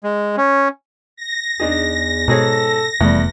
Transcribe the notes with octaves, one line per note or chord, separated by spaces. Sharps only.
G#3
C#4
A#6
E2 D4 D#4 G#4
G#2 B2 G#4 A4 C#5
F1 E2 G3 A3 B3